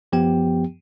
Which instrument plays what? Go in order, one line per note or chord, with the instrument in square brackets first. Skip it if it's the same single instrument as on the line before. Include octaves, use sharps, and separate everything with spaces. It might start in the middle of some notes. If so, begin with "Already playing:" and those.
[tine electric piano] F#2 F3 B3 G4 G5